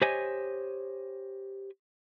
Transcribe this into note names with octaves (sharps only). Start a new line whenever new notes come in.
G4 C5 C#5 D#5 G#5